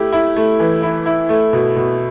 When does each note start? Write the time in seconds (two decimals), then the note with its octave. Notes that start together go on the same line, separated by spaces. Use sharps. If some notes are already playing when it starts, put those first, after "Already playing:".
Already playing: A3 E4 G4
0.13 E4
0.36 A3
0.60 E3
0.82 E4
1.06 E4
1.29 A3
1.53 B2
1.76 B2